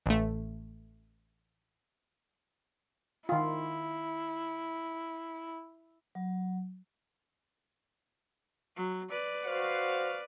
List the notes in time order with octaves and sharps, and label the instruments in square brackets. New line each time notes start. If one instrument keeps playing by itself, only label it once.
[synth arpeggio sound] A1 A3
[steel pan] D#3 F4 [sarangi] E4
[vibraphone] F#3
[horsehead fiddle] F#3
B4 D5
[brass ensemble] F#4 C5 F5